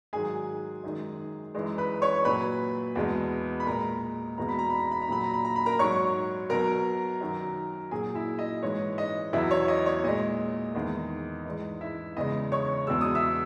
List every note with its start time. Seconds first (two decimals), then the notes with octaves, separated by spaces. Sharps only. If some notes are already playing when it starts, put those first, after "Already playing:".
0.13 G#2 D#3 F#3 G#4 G#5
0.84 F#2 D#3 G#3
1.55 F#2 E3 G#3
1.78 B4 B5
2.02 C#5 C#6
2.25 A#2 F#3 B4 B5
2.95 E2 B2 G#3
3.60 B5
3.67 A#2 G#3 A#4 A#5
4.38 E2 B2 G#3 A#5
4.48 B5
4.59 A#5
4.70 B5
4.80 A#5
4.91 B5
5.02 A#5
5.08 A#2 F#3 B5
5.24 A#5
5.33 B5
5.45 A#5
5.56 B5
5.66 A#4 A#5
5.79 G#2 F#3 C#5 C#6
6.50 B2 F#3 A#4 A#5
7.21 F#2 D#3 F#3
7.91 A#2 F#3 G#4 G#5
8.15 E4 E5
8.39 D#5
8.63 G#2 E3 G#3 C#5
8.98 D#5
9.33 E2 B2 F#3 E4 E5
9.51 C#5
9.68 D#5
9.86 C#5
10.04 A#2 G#3 D#5
10.75 E2 D#3 G#3
11.45 G#2 E3 G#3
11.81 E4 E5
12.16 E2 C#3 G#3 D#5
12.52 C#5 C#6
12.87 E2 B2 G#3 E6
13.01 D#6
13.15 E5 E6